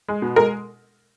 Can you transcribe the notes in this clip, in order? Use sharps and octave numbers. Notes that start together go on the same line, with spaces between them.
G#3
B2
G#3 A#4